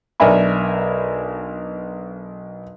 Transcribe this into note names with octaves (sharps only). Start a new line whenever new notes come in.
B1 D4 A#4 E5 G#5 B5